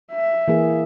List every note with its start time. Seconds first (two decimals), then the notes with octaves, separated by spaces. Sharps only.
0.12 E5
0.48 E3 A#3 G#4